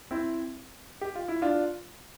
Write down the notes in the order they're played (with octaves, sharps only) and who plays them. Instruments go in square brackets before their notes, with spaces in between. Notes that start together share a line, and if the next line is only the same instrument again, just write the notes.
[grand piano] C4 E4
G4
F4
E4
D4 F4